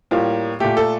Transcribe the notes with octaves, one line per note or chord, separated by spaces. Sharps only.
A2 G3 A#3 F4
A#2 A3 G4
A4